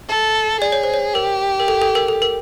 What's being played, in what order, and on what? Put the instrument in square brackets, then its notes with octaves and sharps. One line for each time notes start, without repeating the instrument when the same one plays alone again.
[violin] A4
[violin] G#4 [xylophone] D5
[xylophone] C#5
C5
C#5
[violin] G4 [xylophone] A#4
[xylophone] A#4
A4
A4
A#4
A4
A#4